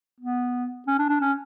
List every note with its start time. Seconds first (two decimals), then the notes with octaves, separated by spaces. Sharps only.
0.20 B3
0.87 C#4
0.98 D4
1.09 D4
1.21 C#4